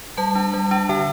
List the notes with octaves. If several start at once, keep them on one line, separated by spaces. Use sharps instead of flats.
G3 A5
D4
G3
D4
D3 G5